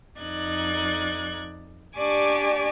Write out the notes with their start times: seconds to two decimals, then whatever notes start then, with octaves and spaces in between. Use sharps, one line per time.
0.20 F2 D#4 D5 F#6 G#6
1.97 D4 G4 D5 G#5 C#6 D6